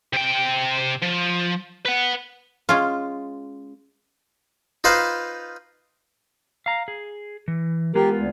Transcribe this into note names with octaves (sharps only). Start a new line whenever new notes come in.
C3 G5
F3
B4 F#5
G#3 C#4 F4
D#4 F4 B4 C5 F5
F5 A#5
G#4
E3
G#3 B3 F4 G4 A#4
D2